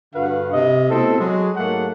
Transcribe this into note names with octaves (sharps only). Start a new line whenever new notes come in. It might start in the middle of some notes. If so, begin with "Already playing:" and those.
G2 D3 F#4 B4 F5 F#5
C3 D#5
B2 A3 C4 E4 A4
F#3 G#3
G#2 F#3 A3 A#3 A4 F#5